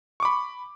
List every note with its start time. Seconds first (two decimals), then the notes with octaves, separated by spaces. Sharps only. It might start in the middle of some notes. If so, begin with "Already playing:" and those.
0.20 C#6
0.23 D6
0.25 B5